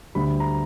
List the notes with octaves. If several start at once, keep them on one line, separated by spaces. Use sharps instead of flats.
D2 D3 G3 B5
A#5